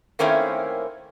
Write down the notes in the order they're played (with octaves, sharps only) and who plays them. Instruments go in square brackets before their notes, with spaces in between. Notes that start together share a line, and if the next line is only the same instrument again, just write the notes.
[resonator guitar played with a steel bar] D#3 A3 A#3 C4 C#4 E4